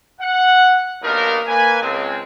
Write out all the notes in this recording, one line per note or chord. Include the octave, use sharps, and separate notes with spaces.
F#5
B1 A#3 D4 D#4 G4 A#4
A#3 B4 G#5
C#2 G#3 C4